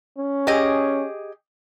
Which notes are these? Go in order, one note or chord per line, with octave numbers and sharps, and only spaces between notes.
C#4
G4 G#4 D#5